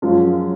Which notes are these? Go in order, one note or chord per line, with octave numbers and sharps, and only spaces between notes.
F#2 F3 G#3 C#4 F4